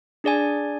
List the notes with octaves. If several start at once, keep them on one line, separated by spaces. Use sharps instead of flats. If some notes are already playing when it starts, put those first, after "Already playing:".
D4 G#4 D5 G#5